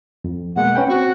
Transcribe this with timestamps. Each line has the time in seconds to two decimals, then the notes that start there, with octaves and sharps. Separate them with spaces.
0.24 F2
0.56 B2 G#3 A#3 F#5
0.75 C#4 B4 G5
0.89 C4 F#4